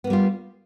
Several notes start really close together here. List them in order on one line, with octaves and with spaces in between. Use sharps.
B3 A#3 G3 F4